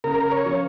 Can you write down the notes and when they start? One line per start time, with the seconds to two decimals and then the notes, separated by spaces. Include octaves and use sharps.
0.04 C#3 A#4
0.31 C#5
0.45 F3 C#4 F4